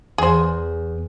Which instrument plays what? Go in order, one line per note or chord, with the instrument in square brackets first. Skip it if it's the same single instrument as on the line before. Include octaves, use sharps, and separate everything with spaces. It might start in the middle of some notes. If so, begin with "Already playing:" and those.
[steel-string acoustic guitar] E2 [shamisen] G#4 C5